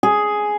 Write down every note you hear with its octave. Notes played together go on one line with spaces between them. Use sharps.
G#4